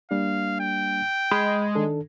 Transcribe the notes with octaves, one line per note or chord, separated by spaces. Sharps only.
G3 A#3 D4 F5
G5
G#3 B5
D#3 D4 A4